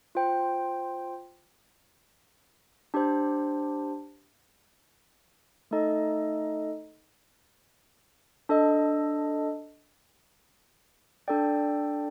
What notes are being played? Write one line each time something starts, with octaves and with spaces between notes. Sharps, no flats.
F4 C5 G5
D4 G4 C5
A3 D#4 A4 D#5
D4 A4 D#5
D4 A4 D5 G5